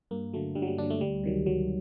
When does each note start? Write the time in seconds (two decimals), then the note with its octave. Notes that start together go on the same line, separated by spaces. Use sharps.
0.11 G2 A#3
0.33 D3 F#3 A3
0.55 G2 G3
0.62 F#3
0.67 G3
0.78 D3 D4
0.83 F#3
0.90 A3
1.01 D2 G3
1.24 C3 D#3 F#3
1.46 D2 F#3